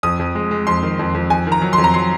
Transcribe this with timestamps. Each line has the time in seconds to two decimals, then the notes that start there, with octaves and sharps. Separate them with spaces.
0.03 F2 D#6
0.19 F2
0.35 G#3
0.51 G#3
0.67 F2 C6
0.83 D#3
0.99 F2
1.15 F2
1.30 F2 G#5
1.47 D#3
1.52 A#5
1.62 F#3
1.73 C6
1.78 F2
1.84 A#5
1.94 F#3 C6